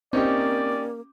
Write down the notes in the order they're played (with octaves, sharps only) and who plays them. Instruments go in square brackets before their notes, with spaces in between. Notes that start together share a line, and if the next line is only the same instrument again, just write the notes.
[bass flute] A#3 [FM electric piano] C4 [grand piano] C#4 D#4 G4 [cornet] D5